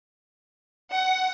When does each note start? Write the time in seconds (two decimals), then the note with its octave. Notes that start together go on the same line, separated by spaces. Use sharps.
0.92 F#5